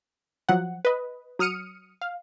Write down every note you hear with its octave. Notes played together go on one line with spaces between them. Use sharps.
F3 F#3 F#5
B4 D#5
F#3 D#6 F6 C#7 D#7
F5